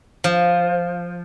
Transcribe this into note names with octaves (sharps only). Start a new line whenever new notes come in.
F3